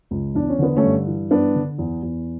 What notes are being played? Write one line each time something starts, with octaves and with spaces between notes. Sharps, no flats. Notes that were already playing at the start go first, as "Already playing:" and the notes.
C#2
E2 D4
C#4
D3 B3
A3 C#4
G2
E3
G2 B3 D4
D3
E2
E2